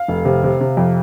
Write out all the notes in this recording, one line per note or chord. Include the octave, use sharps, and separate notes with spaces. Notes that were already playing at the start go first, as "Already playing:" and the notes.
Already playing: F5
F1
C3
C3
C3
F2